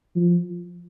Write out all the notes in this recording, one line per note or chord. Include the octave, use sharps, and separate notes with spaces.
F3